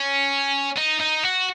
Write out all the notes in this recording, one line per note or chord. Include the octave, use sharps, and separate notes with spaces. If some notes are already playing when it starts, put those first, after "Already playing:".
Already playing: C#4
D#4
D#4
F#4